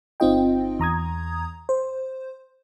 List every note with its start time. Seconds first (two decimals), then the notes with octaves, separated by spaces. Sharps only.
0.20 G1 C4 D#4 F4 D#5 G5
0.79 E2 A#5 D#6 G#6
1.69 C5